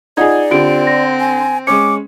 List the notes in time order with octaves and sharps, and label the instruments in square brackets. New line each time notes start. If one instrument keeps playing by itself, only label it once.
[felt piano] D#4 G#4 [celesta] F4 F#5 G#6 [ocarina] D5
[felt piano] D3 [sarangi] C4 [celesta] F4 G4 D7
[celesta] A#6
[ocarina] G#5
[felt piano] G#3 C#4 [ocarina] D6 [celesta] C#7